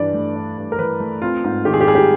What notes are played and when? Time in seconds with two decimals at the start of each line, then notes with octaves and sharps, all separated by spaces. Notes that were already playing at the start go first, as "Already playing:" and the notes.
Already playing: G2 E3 D4 D5
0.14 A3
0.36 D4
0.58 G2
0.72 A#4
0.79 E3 B4
1.00 A3
1.22 C4 F4
1.44 G#2
1.65 D#3 G4
1.74 G#4
1.81 G4
1.87 G3 G#4
1.95 G4